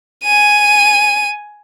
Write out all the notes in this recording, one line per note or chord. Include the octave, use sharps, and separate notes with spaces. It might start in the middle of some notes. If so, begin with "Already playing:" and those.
G#5 D#7